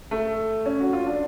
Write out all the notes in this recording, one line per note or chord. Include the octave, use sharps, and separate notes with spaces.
A3
C#4
F#4
F4
D4